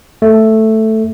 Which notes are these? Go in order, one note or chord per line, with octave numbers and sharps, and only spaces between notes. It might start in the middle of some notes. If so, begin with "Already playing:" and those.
A3